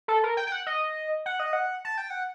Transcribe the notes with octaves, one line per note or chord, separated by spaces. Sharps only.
A4
A#4
G5
G5
F#5
D#5
F#5
D#5
F#5
A5
G5
F#5